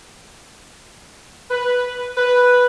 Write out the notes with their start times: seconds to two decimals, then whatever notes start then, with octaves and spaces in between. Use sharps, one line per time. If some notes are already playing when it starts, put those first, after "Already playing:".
1.51 B4
2.18 B4